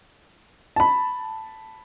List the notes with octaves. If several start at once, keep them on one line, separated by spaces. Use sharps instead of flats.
A5 B5